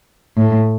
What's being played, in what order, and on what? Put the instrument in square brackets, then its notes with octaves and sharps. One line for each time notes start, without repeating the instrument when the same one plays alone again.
[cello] A2